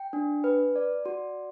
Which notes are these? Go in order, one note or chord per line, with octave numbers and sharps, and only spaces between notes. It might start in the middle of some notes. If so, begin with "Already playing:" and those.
Already playing: G5
D4
B4
D5
F#4